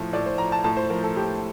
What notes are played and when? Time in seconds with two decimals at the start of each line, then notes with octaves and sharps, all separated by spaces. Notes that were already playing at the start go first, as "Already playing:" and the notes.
Already playing: A2 F3
0.13 A2 D5
0.26 C5
0.38 F3 A#5
0.52 A5
0.64 A2 A5
0.77 C5
0.90 F3 A#4
1.04 A4
1.16 A2 G4